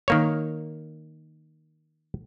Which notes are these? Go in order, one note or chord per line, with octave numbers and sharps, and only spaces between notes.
D#3 A#3 C#5